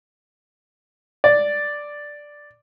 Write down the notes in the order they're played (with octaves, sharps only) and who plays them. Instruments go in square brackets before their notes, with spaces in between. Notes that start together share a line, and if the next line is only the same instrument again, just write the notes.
[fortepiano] D5